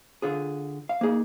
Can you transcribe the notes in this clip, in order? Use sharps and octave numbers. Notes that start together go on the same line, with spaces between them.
D3 F4 G#4
F5
A#3 D#4 G#4